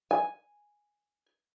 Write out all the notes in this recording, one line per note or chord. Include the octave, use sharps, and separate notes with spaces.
G#5